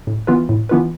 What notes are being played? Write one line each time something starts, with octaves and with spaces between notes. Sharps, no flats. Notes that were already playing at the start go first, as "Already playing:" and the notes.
A2
E3 B3 F4 B4
A2
E3 B3 F4 B4